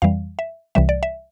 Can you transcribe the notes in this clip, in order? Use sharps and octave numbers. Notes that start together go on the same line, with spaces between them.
F2 E3 G3 F5
E5
C2 C3 E3 G3 E5
D5
E5